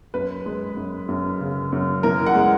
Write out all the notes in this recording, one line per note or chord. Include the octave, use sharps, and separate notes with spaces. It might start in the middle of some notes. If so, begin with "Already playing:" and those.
F#2 B4
G#3
F#2
F#2
C#3
F#2
E3 A#4
F#5
G#3